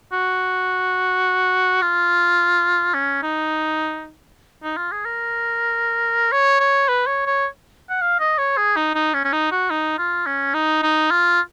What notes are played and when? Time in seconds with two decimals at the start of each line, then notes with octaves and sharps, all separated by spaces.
0.12 F#4
1.82 F4
2.94 C#4
3.23 D#4
4.63 D#4
4.77 F4
4.92 G#4
5.05 A#4
6.32 C#5
6.60 C#5
6.89 B4
7.07 C#5
7.26 C#5
7.90 F#5
8.01 F5
8.20 D#5
8.38 C#5
8.57 G#4
8.76 D#4
8.95 D#4
9.14 C#4
9.24 C#4
9.33 D#4
9.52 F#4
9.70 D#4
9.98 F4
10.26 C#4
10.54 D#4
10.83 D#4
11.11 F4